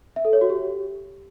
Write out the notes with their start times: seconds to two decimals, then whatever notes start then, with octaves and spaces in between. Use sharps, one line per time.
0.16 E5
0.25 A4
0.33 C#5
0.41 F#4
0.50 G4